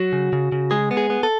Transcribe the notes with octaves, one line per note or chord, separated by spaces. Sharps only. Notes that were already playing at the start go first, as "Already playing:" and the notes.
Already playing: F#3 F#4
C#3
C#3
C#3
G#3 G#4
B3
G#4
B3
A4